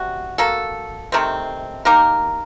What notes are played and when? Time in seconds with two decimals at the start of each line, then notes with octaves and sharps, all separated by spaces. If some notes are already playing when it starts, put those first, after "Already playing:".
Already playing: C3 G3 F#4
0.38 A#3 F#4 A4
1.12 C3 D#3 A3 C4
1.85 A#3 D#4 G4 A#4